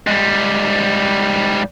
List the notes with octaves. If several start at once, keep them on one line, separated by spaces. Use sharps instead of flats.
G#2 G3